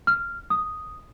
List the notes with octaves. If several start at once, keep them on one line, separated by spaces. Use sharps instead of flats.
F6
D#6